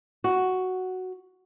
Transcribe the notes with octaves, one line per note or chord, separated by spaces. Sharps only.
F#4